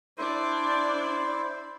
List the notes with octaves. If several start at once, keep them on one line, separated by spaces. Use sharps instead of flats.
D4 E4 C5 D5